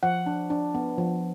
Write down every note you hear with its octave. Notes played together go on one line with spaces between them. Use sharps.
F3 F#5
D4
D4
B3
F3